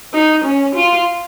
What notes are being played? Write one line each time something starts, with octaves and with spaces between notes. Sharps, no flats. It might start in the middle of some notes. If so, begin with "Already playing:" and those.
D#4
C#4
F4